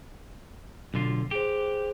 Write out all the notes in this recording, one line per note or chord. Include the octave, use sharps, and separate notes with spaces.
B1 D3 F4
G4 G#4 C5